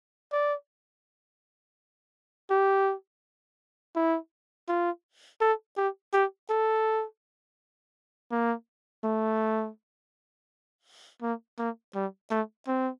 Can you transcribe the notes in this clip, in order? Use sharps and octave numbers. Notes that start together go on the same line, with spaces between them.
D5
G4
E4
F4
A4
G4
G4
A4
A#3
A3
A#3
A#3
G3
A3
C4